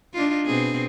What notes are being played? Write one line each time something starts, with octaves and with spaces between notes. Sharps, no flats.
D4 D#4 F4
B2 C4 G#4